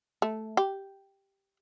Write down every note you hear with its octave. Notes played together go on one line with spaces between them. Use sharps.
A3
G4